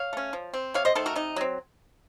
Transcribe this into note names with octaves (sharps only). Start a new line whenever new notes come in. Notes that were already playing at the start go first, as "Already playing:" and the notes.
Already playing: C#5 F5
A3 C#4
F3
C4
C3 C#5 F5
C5 D#5
D#3 A3 A4 C5
F#4 A#4
C3 D#4
F#3 C4